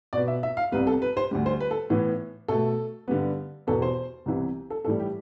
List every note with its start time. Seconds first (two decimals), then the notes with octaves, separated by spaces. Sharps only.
0.13 B2 B3 D5
0.28 E5
0.43 E5
0.57 F5
0.72 C2 C3 G3 B3 B4
0.87 A4
1.02 B4
1.17 C5
1.31 D2 D3 G3
1.46 C5
1.60 B4
1.71 A4
1.90 A2 E3 B3
2.48 B2 A3 A4
3.08 G2 D3 G3 B3
3.67 E2 B2 B3 A4
3.82 C5
4.26 C2 C3 E3 B3
4.70 A4
4.85 A2 E3 G3 A4
5.00 G4